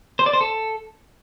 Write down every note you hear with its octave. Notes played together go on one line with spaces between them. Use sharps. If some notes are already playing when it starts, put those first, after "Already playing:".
C5
D5
C5
A4